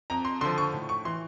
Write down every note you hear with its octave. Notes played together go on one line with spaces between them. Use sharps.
F2 A#5
C6
D3 F3 C6
C#6
A2
C#6
E3 C6